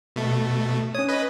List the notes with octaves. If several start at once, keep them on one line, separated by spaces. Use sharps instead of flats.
B2 A3
C#4 C#5 D#6
B4 D#5